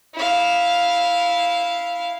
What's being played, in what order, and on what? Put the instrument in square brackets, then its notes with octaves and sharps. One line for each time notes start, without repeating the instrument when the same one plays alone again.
[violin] E4 F5